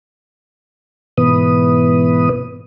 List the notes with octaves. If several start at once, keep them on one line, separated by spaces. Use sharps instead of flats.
G#2 B2 E3 B3 B4 D#6